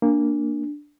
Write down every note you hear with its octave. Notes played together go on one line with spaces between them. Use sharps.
A#3 D4